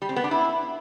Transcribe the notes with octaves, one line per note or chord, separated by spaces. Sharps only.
G3
C4
B3
D4
E4